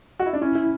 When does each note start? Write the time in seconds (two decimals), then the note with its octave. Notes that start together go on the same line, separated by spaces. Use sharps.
0.19 F#4
0.26 E4
0.33 D4
0.41 C#4 E4
0.56 E4